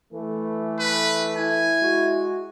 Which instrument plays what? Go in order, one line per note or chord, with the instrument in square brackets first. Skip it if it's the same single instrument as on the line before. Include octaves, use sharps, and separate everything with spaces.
[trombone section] E3 A3
[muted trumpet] B4
[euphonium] E4 [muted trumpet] G#5
[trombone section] G#3 F#4